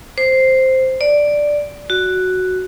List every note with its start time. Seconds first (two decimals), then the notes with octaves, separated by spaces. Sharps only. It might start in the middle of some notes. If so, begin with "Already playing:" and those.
0.18 C5
1.01 D5
1.90 F#4